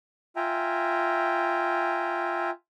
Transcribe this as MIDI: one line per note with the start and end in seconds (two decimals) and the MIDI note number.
0.36 2.50 65
0.36 2.50 76
0.36 2.50 79
0.36 2.50 80
0.36 2.50 82